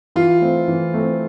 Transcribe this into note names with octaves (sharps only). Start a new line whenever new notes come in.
E3 F4
A3 C4
E3
A3 C4